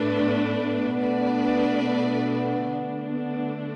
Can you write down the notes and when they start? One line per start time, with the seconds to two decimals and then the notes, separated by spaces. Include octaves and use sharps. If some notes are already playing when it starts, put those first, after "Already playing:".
Already playing: A2 A3 D4 B4
0.12 B3
0.97 B2 A3 D4 B4 D5
1.83 B3
2.68 D3 A3 D4
3.11 B3